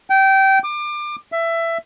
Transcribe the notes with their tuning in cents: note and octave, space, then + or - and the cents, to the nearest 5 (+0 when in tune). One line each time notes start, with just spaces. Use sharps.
G5 -20
D6 +30
E5 +15